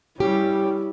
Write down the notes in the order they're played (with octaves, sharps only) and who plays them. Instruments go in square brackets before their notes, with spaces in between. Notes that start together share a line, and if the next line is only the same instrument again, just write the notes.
[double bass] G3 C#4 [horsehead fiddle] E4 [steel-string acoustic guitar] G4